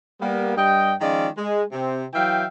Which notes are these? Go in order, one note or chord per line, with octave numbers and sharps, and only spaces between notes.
G3 A#3 B3
G2 G3 D#5 G5
D#3 F3 G#3 C#4 F4 D5
G#3
C3 C4
E3 F#3 E5 F5 G5